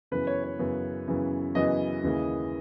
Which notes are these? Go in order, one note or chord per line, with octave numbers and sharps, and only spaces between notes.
F#2 C#3 E3 B3 B4
C#5
C#5
F#2 C#3 E3 B3
F#2 C#3 E3 B3
F#2 C#3 E3 B3 D#5
D#2 C#3 E3 G#3